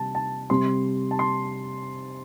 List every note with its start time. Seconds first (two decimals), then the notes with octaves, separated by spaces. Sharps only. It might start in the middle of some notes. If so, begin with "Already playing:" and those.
Already playing: C3 G3 A5
0.15 A5
0.50 C3 G3 C4 C6
1.11 A5
1.19 C6